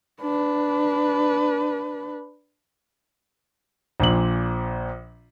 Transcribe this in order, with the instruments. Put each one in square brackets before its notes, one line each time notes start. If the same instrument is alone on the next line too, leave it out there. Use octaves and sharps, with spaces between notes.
[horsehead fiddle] D4 B4
[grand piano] A#1 A#2 F#7